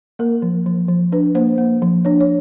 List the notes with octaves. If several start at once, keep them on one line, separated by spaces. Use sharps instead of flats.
A#3 A#4
F3
F3
F3
D4 B4
A#3 C5
A#3
F3
D4 C#5
C#5